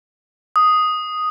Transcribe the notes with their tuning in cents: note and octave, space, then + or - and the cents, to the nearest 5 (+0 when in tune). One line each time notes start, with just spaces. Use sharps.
D#6 +0